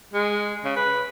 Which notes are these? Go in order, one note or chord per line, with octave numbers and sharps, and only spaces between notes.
G#3
C#3
B4